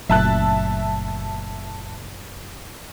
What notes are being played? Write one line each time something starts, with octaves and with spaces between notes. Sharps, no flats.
F#1 A#2 F#3 A3 E5 A5 F#6